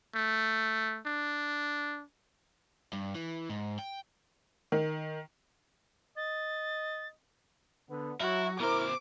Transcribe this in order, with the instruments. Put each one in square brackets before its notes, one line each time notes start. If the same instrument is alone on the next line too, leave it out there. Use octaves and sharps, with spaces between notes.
[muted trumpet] A3
D4
[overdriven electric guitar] G2
E3
G#2
G5
[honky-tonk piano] D#3
[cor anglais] D#5 [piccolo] A6
[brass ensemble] D3 B3
[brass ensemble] F#3 [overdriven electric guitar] E4 [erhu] F#4
[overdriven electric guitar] B2 C5 [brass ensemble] E4 A#4 [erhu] D6